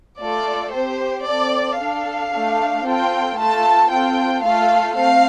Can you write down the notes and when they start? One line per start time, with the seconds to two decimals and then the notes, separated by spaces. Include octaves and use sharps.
0.20 A3 F4 A4 D5
0.73 C4 G4 C5
1.26 C4 A4 D5
1.79 D4 A4 F5
2.32 A3 D4 A4
2.85 C4 F4 A4 G5
3.38 A3 F4 A4 A5
3.91 C4 F4 A4 G5
4.44 A3 F4 A4 F5
4.97 A3 C4 F5